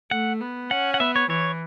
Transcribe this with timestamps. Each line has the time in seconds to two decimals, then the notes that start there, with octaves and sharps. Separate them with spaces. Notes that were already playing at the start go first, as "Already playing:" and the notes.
0.11 A3 F#5
0.41 B3
0.71 C#4 F#5
0.94 F#5
1.00 B3 E5
1.16 C#5
1.30 E3 C#5